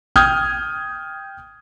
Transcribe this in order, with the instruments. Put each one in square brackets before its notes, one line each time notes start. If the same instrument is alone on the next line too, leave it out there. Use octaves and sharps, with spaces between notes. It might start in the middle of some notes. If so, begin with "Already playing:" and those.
[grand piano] G5 D#6 F6 G6 G#6